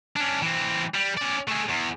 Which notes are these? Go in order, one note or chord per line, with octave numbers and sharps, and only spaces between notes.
C#4 D4
E3 C4
G3
C#4 D5
A3 G#4
E2